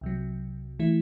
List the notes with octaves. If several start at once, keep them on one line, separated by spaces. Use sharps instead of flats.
C2 C3 F#3
E3 A3 E4